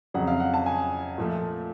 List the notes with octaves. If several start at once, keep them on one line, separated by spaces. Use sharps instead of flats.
F2 C#3 F#3 F#5
F5
F#5
A5
G#5
A#2 F3 A3